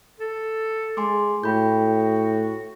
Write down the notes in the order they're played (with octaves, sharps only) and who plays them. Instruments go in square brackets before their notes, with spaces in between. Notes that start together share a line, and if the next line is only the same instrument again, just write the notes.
[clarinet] A4
[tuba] G#3 [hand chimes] G#5 C6 D6
[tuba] A2 [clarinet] F#4 [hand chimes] G5 B5 G6